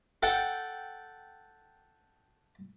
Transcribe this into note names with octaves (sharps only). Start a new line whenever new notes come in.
A4 F#5 G5